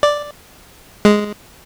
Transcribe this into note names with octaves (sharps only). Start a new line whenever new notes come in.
D5
G#3